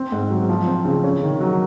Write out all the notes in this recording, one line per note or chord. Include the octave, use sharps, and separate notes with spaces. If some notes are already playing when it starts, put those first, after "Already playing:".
Already playing: C4
G#2
F#3
F3
C4
C#3
C#4
D#3
F#3